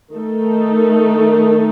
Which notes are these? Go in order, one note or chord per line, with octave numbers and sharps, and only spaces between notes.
D#3 A3 D#4 A4